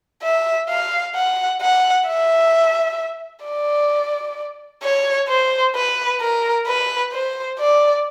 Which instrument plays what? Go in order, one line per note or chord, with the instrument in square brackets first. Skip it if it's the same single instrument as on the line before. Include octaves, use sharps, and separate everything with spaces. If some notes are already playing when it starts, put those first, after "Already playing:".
[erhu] E5
F5
F#5
F#5
E5
D5
C#5
C5
B4
A#4
B4
C5
D5